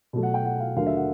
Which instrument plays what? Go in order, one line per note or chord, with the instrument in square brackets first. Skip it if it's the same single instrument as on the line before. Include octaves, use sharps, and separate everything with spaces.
[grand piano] B2 F#3 A3
F#5
G5
F#5
F5
D#2 D3 F#3 A3 F5
E5
F#5